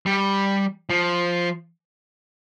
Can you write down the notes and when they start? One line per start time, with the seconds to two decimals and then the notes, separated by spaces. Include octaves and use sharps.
0.06 G3
0.90 F3